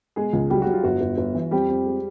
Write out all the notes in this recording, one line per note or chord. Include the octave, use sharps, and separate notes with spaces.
B2 G#3 G#4
C#2
F#3 G3 G4
F#3 F#4
F4
G1 F#4
G1
G1
E3
F2 G3 G4
F2
G#3